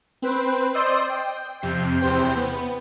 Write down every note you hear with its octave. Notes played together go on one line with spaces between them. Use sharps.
C4 B4 C5
C5 D5 D#5 C6 D#6 E6
G5
F2 C3 G6 C7
E2 C3 C5 G5
B3